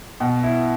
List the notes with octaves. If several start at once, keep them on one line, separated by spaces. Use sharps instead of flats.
B2
E4